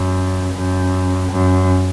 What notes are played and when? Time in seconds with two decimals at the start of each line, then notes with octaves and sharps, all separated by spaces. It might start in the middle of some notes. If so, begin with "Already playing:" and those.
Already playing: F#2
0.53 F#2
1.31 F#2